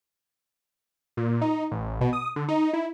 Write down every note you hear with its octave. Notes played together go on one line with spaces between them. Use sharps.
A#2
D#4
A1
B2
D#6
D3
D#4
E4